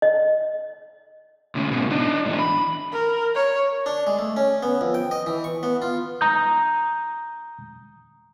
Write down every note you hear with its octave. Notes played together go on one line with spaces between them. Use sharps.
D#5
D2 C#3
G#2 B2
D4 D#4
G#2 E3
B5
A#4
C#5
D4
G#3
A3
C#4
B3
F2
G5
D#5
E3
C#6
B3
F4
A#5 D#6 G6